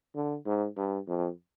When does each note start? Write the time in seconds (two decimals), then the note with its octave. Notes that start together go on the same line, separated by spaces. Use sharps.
0.15 D3
0.46 G#2
0.77 G2
1.08 F2